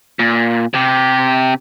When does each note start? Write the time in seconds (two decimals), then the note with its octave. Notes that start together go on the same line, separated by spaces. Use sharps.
0.19 A#2
0.74 C3 G4